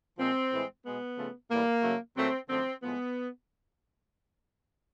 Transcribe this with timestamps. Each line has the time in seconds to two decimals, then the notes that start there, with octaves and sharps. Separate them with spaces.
0.17 A#2 F3 G#3 C4
0.50 A2 E3 G#3
0.84 B2 G#3 B3
1.17 C#3 F3 A3
1.49 A2 E3 G3 A#3
1.83 C#3 F#3 A3
2.15 A#2 F#3 A3 C4
2.48 F#2 D3 F3 A3 C4
2.82 A2 F3 G#3 B3